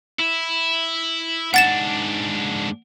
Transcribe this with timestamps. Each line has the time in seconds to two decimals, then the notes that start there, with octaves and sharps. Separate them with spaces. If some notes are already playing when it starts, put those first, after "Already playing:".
0.19 E4
1.54 G#2 D4 F#5 A6 E7